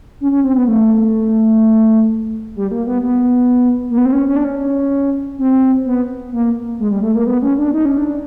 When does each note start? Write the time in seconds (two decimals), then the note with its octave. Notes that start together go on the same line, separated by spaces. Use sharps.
0.21 C#4
0.32 C#4
0.44 C4
0.56 B3
0.67 A3
2.56 G3
2.71 A#3
2.87 B3
3.03 B3
3.90 A#3
3.98 B3
4.05 C4
4.13 C#4
4.28 C#4
4.36 D4
4.44 C#4
5.38 C4
5.85 B3
6.32 A#3
6.79 G#3
6.91 G3
7.03 A3
7.15 A#3
7.26 B3
7.42 C#4
7.58 D4
7.74 D#4
7.85 C#4
7.98 D4